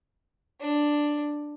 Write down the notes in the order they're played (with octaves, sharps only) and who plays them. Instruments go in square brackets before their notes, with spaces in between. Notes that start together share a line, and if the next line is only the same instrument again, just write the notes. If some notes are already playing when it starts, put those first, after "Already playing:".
[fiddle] D4